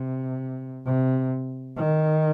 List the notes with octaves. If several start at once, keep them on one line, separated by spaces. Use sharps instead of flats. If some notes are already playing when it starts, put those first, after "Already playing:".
Already playing: C3
C3
D#3